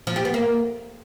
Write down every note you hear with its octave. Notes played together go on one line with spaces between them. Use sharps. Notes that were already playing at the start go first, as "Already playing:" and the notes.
F3
G4
B3
A#3